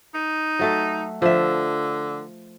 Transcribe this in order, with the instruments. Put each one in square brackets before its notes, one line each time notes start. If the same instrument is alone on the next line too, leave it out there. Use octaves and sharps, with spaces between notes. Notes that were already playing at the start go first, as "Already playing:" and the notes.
[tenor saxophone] D#4
[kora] F#3 A3 A4
[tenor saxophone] D3 [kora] F3 E5